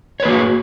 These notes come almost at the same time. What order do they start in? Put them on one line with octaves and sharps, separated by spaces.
C#5 B4 A#3 F#4